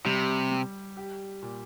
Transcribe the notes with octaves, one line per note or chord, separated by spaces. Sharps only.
C3 G3
G3
G4
A#2